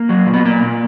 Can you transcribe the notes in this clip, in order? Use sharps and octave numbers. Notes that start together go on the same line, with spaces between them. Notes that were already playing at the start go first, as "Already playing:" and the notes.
Already playing: A#3
F#3
A#2
B3
A#2 A#3
A#2